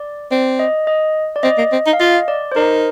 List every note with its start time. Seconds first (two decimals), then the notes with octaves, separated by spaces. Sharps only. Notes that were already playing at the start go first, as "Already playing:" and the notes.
Already playing: D5
0.31 C4 D5
0.59 D#5
0.87 D#5
1.36 D5
1.43 C4 D#5
1.58 A#3
1.72 C4
1.86 D#4
1.93 F5
2.00 F4 D#5
2.28 D5
2.52 C5
2.56 D#4 A#4